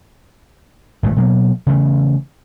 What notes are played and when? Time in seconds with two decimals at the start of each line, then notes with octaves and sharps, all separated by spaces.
1.03 G#1 G2 A#2 A3
1.16 B2 F#3 G#3 A#3
1.67 C#3 E3 A3